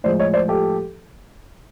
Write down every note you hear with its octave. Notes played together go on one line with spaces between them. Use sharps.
A2 F3 G#3 C5 D5
C#5 D#5
C5 D5
G4 A4